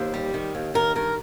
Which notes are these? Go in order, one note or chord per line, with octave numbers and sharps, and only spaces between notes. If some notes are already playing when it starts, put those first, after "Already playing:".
Already playing: D#2 C5
G3
D#3
D#2
D#3 A#4
G2 A#4